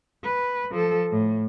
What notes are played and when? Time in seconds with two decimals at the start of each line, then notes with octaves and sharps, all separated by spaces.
0.24 B4
0.72 F3 A4
1.11 A2